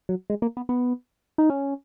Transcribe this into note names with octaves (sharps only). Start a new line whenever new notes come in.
F#3
G#3
A#3
B3
B3
D#4
C#4